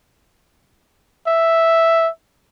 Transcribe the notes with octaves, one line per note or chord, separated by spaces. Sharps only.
E5